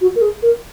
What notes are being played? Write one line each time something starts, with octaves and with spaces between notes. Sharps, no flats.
F#4
A#4
G#4
A#4